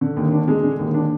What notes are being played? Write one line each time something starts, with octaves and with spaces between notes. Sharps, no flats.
D3
D#2
D4
G#3
D3
D#2
D4